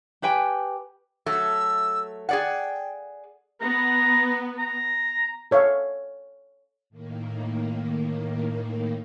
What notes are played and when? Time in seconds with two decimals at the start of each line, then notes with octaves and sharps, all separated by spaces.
0.22 G4 B4 G5 G#5
1.26 F#3 A3 E6
2.29 G#4 D5 F#5 G5
3.61 B3 A#5
4.58 A#5
5.51 A4 C#5 E5 F5
6.90 A2 D#3 A#3